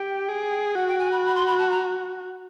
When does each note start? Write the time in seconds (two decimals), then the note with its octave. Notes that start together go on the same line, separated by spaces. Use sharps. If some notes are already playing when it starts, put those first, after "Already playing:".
Already playing: G4 G5
0.29 G#4
0.75 F#4 F#5
0.88 G5
0.99 G#5
1.12 B5
1.26 B5
1.35 C6
1.47 B5
1.58 A5
1.70 A#5